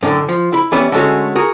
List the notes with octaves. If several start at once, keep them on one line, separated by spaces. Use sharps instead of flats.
F#2 A2 D3
F3
E4 B5
E3 G3 B3 C#4 B4 E5
D3 G#3 A3 C#4 F#4
F#4 G#4 A#4